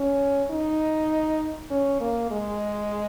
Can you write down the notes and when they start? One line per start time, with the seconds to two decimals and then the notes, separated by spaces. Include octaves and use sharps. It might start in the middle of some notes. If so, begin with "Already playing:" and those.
Already playing: C#4
0.51 D#4
1.71 C#4
2.01 A#3
2.31 G#3